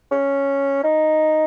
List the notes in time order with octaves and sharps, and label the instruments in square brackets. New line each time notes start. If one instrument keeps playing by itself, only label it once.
[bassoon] C#4
D#4